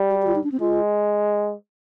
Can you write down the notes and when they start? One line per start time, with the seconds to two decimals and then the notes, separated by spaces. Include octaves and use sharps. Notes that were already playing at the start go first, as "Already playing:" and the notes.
Already playing: G3
0.10 G4
0.22 G4
0.27 F4
0.36 D#4
0.44 D4
0.52 C4
0.60 G#3 F4